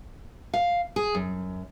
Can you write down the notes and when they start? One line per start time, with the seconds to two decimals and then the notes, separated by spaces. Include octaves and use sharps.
0.54 F5
0.96 G#4
1.15 F#2